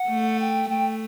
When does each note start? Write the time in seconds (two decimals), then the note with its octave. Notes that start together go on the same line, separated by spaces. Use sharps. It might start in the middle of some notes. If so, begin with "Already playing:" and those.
Already playing: F#5
0.08 A3
0.40 G5
0.69 A3 G5